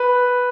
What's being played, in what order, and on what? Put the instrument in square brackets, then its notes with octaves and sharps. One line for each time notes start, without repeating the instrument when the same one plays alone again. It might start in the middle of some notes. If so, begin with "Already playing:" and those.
Already playing: [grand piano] B4